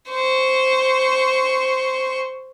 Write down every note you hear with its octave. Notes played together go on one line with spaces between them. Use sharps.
C5 C#6